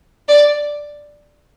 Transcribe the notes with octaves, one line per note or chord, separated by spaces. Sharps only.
D5